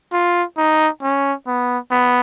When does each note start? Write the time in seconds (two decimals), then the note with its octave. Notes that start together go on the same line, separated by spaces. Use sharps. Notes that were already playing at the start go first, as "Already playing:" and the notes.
0.13 F4
0.57 D#4
1.02 C#4
1.47 B3
1.91 B3